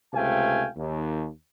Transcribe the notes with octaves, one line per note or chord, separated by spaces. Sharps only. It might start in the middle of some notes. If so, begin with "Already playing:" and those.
C#2 C3 A3 F5 G5 G#5
D#2